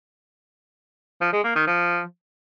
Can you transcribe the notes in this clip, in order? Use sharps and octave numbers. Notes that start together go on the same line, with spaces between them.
F3
G#3
A#3
D#3
F3